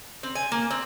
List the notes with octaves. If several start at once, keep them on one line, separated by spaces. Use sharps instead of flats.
C4
G#5
A#3
C4